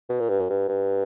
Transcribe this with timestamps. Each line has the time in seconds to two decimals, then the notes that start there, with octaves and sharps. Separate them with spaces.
0.10 B2
0.20 A#2
0.29 G2
0.40 F#2
0.50 G2
0.69 G2